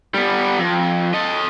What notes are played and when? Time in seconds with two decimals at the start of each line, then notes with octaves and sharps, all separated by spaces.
0.14 G3 B3
0.58 F2
1.14 A4 D#5